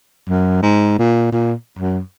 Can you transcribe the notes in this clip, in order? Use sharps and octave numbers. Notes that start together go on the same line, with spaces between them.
F#2
G#2
A#2
A#2
F#2